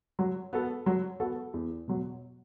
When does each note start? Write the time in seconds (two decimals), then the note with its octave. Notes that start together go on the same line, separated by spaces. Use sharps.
0.19 F#3
0.53 B3 F#4 A4
0.86 F#3
1.20 B3 F#4 A4
1.54 E2
1.88 B2 F#3